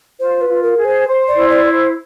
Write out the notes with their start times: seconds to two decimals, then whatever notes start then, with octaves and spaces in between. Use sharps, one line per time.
0.19 F4 C5
0.41 B4
0.49 F4
0.63 A#4
0.77 G#4
0.84 C5
1.06 C5
1.28 D5
1.35 E4
1.49 D5
1.64 C5